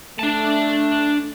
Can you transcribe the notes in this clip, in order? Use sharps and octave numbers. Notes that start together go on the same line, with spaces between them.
A3 D4 A5